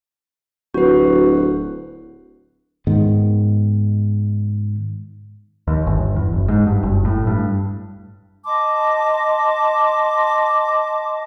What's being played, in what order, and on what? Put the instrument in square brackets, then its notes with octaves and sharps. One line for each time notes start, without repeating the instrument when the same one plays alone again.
[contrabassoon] D1 [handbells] F#4 B4
[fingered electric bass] G#2 D#3 B3
[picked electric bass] D#2
G1
E2
F#1
G#2
G2
F#1
A2
G2
[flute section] D#5 A5 C6 D6